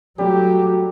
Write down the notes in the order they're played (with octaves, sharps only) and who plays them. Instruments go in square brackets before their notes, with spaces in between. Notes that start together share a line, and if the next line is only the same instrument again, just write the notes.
[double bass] F#3 [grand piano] G3 A3 [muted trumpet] G4